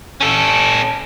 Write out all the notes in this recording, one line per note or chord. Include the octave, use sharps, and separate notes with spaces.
C#4 A4